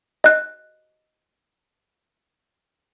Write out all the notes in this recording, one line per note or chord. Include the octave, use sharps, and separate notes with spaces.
D#5 F#6